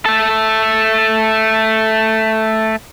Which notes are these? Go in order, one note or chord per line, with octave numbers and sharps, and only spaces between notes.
A3 A4